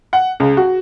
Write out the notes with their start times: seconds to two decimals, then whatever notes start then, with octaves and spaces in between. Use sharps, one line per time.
0.13 F#5
0.40 C#2
0.57 F#4